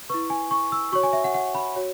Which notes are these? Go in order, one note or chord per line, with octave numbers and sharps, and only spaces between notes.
E4 B4 C#6
G#5
C#6
E6
F#4 C#5 C#6
G#5
E5
F#5
F#5
B5
F#4 C#5